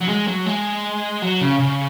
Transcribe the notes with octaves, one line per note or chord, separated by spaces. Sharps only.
F#3
G#3
F#3
G#3
F#3
C#3
C#3